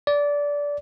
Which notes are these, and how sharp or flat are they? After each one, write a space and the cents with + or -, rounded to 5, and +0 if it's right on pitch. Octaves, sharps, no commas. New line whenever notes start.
D5 -20